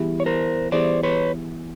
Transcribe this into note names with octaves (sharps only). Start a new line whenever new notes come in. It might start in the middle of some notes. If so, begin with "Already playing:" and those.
Already playing: E3 G3 B3 E4 G#4
C#5
A#4 C5
E3 G3 B3 E4 G#4 C5 D5
B4 C#5